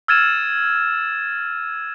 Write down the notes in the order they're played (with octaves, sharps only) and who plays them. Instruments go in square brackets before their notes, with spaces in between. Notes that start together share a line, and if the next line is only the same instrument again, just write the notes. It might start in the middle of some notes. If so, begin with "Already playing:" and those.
[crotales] E6 F6 G#6 A6 D#7 E7